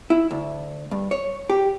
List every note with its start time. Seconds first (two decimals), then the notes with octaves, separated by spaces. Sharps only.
0.10 E4
0.31 D2
0.91 G2
1.11 C#5
1.50 G4